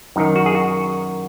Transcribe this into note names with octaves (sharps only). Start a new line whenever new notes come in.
F#2 D#3 D#4
F#4
G#4
F#4